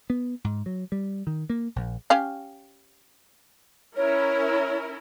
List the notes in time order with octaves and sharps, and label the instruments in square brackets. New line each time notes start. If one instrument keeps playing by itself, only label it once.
[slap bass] B3
G#2
F#3
G3
D#3
A#3
A#1
[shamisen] C#4 G4 F5
[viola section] C#4 E4 A#4 [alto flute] C#5